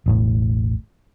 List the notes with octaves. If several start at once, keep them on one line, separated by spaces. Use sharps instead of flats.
E1 A1 A2